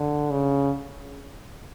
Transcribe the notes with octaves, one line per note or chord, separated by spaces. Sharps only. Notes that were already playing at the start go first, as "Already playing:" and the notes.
Already playing: D3
C#3